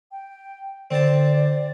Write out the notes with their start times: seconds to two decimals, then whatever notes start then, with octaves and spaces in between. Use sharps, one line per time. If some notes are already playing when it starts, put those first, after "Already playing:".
0.12 G5
0.91 D3 C4 D5 A5